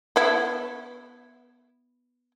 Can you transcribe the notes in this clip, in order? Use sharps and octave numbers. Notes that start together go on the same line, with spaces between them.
B3 E4